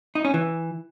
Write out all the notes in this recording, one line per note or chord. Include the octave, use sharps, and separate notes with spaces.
D#4
C#4
E3